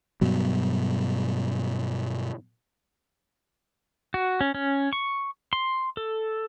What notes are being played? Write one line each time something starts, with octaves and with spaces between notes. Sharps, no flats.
G2 B2 F#3
F#4
C#4
C#4
C#6
C6
A4